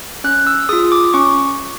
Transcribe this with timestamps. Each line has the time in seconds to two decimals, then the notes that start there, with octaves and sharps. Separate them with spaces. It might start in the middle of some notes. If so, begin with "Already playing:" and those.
0.24 C#4 F#6
0.47 E6
0.69 F4 G#4 D#6
0.92 D6
1.14 C#4 C#6